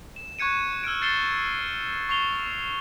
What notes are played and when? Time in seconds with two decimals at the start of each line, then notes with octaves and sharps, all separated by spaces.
0.16 E7
0.39 C#6 F#6 G#6 C#7 D#7
0.84 E6 F6 G#6 D7
1.01 G6 A6 C7 C#7 E7 G7
2.09 C#6 C7 F7 G7